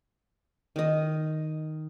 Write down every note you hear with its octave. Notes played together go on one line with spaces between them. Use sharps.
D#3 D#5